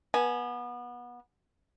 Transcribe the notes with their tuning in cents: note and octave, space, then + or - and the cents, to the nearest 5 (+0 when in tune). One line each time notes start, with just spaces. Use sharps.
B3 -25 G#5 +5